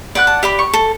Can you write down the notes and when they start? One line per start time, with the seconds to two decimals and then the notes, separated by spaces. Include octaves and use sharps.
0.15 B4 D5 F#5 F#6
0.27 A5
0.43 G4 D5 B5
0.59 C#6
0.73 A4